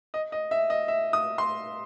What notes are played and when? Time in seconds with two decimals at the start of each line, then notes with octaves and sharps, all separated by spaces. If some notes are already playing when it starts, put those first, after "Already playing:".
0.14 D#5
0.32 D#5
0.51 E5
0.70 D#5
0.88 E5
1.13 D#6
1.38 C6